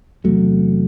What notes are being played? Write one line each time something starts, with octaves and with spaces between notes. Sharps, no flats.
E2 C3 F#3 A3